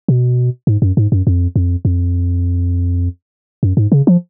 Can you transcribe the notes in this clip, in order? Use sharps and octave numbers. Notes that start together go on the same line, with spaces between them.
B2
G#2
F#2
G#2
F#2
F2
F2
F2
F#2
G#2
C#3
F3